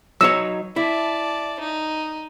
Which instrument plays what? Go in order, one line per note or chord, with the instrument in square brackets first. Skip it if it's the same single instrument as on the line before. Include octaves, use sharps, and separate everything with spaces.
[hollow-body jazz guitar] F#3 D#4 C#5 [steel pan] E6
[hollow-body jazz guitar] E4 [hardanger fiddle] D5 A5
[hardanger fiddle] D#4